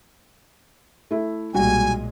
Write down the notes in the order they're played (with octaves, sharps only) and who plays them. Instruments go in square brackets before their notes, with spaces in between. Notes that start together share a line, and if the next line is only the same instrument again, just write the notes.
[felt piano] A3 E4
[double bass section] B1 A#2 G#3 [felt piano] G3 F#4 [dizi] G#5